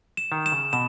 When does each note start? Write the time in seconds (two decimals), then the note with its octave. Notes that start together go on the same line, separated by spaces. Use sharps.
0.17 E7
0.32 D#3
0.46 E7
0.52 C#3
0.73 B2 E7